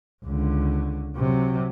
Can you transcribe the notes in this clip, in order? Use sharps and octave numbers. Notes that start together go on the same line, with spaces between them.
C#2 D3
C3 F#3